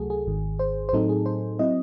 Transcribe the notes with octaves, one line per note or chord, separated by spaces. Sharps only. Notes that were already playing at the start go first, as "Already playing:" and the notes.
Already playing: C#2 C3 F#3 A3 F#4 G#4 A4
G#4
G#1 G#2 D#3
C5
C5
A2 F#3 C4 D#4 A4
G#4
C5
F#3 C4 E4 D#5